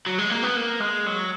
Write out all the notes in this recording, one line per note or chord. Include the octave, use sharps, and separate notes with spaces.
F#3
G#3
A#3
B3
A#3
G#3
F#3